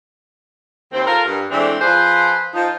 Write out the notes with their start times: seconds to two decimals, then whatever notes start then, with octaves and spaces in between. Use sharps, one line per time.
0.92 D#2 C4
1.05 F4 A4 A#4
1.25 G2
1.50 E3 G#3 A3 C4 D4
1.81 F3 G#4 B4 C5
2.53 F3 D#4